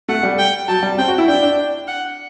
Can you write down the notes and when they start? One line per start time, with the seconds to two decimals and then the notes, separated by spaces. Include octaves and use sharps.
0.08 A3 F#5
0.23 G3
0.38 G5
0.68 F#3 A5
0.83 G3
0.98 C4 G5
1.08 F#4
1.18 E4
1.28 D4 G5
1.42 D4
1.88 F#5